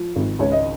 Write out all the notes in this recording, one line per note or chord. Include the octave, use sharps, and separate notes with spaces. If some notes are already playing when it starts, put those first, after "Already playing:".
Already playing: F3
G#1
C#2 C#5
D#5